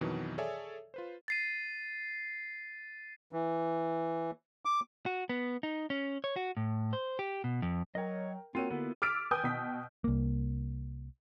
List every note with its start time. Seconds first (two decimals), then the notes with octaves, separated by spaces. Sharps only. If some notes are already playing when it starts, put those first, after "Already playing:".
0.01 F2 B2 D#3 E3 F#3
0.38 G#4 A4 C#5 D5 E5 G#5
0.94 F4 B4 C5
1.28 A6 C7 D#7
3.33 E3
4.65 D6
5.06 F#4
5.29 B3
5.63 D#4
5.90 C#4
6.24 C#5
6.36 F#4
6.57 A2
6.93 C5
7.19 G4
7.44 B2
7.62 F2
7.95 F#3 A#4 C#5 D#5 G5
8.55 A#3 C4 F4 F#4 C#5 D#7
8.70 D3 B3 E4 F4
9.02 D6 E6 F6 A6 B6 D7
9.31 B4 G5 G#5 D#6 G6
9.44 B2 G5 B6
10.04 C2 A#3